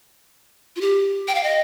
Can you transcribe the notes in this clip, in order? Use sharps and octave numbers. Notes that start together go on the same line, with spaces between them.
F4
G4
G5
F5
D#5